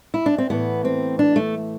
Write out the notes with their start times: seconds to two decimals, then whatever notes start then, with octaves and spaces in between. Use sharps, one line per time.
0.14 E4
0.26 D4
0.38 C4
0.50 A2 E3 B3
0.85 C4
1.19 D4
1.36 A3